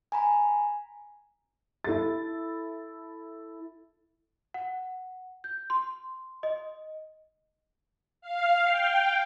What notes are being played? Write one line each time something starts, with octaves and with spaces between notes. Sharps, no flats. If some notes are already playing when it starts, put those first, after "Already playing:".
G#5 A#5 B5
E4 A4 A6
F#5
G6
C6
D#5
F5
G5